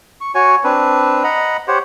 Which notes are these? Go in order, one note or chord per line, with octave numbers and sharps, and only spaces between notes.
C#6
F#4 C#5 G#5 C#6
C4 D4 B4
D#5 F#5 A#5 B5
G4 C5 C#5 F#5